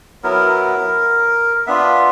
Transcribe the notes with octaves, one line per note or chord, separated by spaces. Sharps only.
F#3 B3 E4 A#4
B3 D4 F4 E5